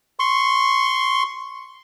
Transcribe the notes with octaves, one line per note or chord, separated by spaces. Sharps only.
C6 C#6